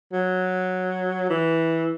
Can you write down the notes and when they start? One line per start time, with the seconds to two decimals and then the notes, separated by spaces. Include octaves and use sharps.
0.12 F#3
1.30 E3